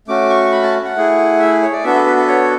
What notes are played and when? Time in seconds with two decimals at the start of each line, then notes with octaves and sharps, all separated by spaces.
0.08 A3 C#4 F#4 D6
0.30 C#6
0.52 B5
0.63 A5
0.85 F#5
0.96 A3 E4 G#4
1.39 E5
1.62 C#5
1.73 D5
1.84 B3 D4 F#4 A4 E5
1.95 B4
2.06 B4
2.17 B4
2.28 C#5